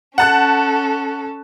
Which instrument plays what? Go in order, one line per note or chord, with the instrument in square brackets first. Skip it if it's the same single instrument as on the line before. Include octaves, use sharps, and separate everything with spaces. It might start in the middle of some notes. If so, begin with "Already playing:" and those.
[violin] C#4 A4 [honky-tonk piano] F#5 A5 F#6